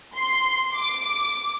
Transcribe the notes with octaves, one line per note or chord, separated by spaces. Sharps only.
C6
D6